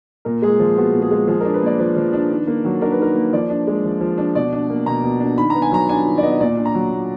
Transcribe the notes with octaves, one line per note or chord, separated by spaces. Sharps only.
A#2 A#4
G#3 G#4
F3 F4
B3 F#4
A#2
G#4
G#3
F3 G#4
D4 A#4
B4
A#3 D5
F3 B4
F3
D4
D#3
A#3
F#3
D4 A#4
B4
D#3 A#4
A#3
F3 D5
D4
G#3
F3
F3
D4
B2 D5
D4
A#3
B2 A#5
B2
D4
D#3 B5
B3 A#5
G#5
F#3 A#5
D4 G#5
D#3
D5
B3 D#5
A#2 D5
D4
A#5
F#3
A#2